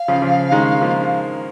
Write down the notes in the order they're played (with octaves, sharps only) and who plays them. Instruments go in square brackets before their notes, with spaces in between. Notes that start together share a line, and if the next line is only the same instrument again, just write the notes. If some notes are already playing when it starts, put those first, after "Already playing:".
Already playing: [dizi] F5
[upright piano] C#3 F3
C#3 F3
D#3 G#3
F3 A#3